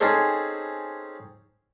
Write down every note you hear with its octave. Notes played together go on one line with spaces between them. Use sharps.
C4 C#4 D#4 G#4 A4 C5